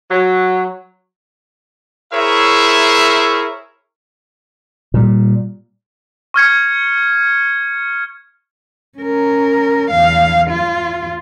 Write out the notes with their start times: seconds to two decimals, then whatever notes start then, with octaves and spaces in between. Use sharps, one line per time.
0.11 F#3
2.13 E4 G#4 A#4 C5 C#5 E5
4.94 A#2 G3
6.34 C#6 F6 G#6 C#7
8.98 C#4 A#4
9.91 E2 F5
10.50 E2 F4